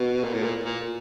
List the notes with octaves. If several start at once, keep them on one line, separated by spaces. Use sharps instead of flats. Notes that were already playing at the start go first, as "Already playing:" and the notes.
Already playing: B2
A#2
A2
A#2
A#2